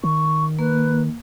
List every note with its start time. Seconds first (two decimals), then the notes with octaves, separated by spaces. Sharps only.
0.04 D#3 C#6
0.59 A#3 B4